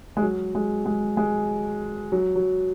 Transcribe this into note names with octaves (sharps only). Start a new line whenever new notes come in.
G#3
F#3
G#3
G#3
G#3
F#3
F#3